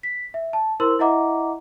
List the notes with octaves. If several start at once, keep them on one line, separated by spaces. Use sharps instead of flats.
B6
E5
A5
E4 A#4 C5 C6 E6 F#7
E4 D#5 E5 F#5 A#5 D6